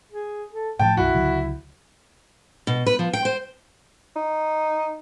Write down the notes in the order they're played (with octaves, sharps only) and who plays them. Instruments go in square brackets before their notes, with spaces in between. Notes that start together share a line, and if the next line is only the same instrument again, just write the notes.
[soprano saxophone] G#4
A4
[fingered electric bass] A2 E3 F3 [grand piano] G5 [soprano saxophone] A5
[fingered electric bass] B1 F#2 [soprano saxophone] E4 [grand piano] F#4
[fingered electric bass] C#2 D3 F#3
[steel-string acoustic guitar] B2
B4
F3
G5
C5
[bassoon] D#4